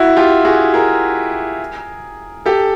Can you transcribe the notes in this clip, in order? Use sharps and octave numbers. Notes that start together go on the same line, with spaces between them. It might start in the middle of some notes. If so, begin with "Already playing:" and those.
Already playing: E4 F#4
F4 G4
F#4 G#4
G#4 A#4
G4 A4